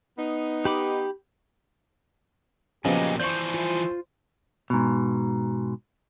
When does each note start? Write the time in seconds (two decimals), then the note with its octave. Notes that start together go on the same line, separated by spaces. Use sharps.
0.17 B3 D#4
0.65 G4 B5 D6
2.85 A#2 C#3 F3 F#3 B3 G4 D#5 G#5
3.20 E3 F3 C5 D5 C#6 G6
3.54 F4
4.70 G#2 B2